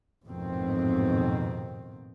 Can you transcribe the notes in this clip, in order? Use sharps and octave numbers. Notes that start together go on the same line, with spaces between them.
A1 F2 G#2 B2 D#3 C4